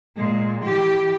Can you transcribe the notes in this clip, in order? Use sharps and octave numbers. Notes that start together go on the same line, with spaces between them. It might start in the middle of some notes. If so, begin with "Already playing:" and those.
A#2 G#3
E3 G4